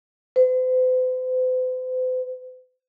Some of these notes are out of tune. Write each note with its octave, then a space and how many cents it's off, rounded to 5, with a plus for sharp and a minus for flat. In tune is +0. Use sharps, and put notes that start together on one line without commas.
C5 -45